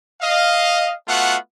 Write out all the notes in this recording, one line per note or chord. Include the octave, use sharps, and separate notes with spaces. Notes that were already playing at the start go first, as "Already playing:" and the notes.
D#5 F5
A3 B3 F4 F#4 F#5